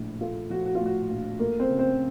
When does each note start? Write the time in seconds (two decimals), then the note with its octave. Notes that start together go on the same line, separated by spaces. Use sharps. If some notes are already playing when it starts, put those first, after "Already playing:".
Already playing: A#1 A2 F3 A3
0.21 A3 F4
0.50 F3 F#4
0.66 F#4
0.75 F4
0.81 A2
0.86 F#4
1.10 A#1
1.39 A3 A#3 A#4
1.60 C4 C5
1.69 C#3
1.78 C4 C5